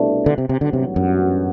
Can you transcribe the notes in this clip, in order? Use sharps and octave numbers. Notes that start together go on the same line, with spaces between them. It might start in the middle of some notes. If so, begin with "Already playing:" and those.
Already playing: C2 B2 A3 D4
D3
C3
C3
A1 G2 D3 F#3 B3 F#4
C3
F#2